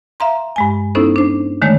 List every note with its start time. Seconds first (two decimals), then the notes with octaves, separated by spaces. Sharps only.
0.20 E5 F5 A#5 C6
0.56 G2 G#3 G#5
0.95 B3 C#4 D#4 E4 A4 C5
1.16 D4 C5
1.62 D3 D#3 G#3 A3 C#5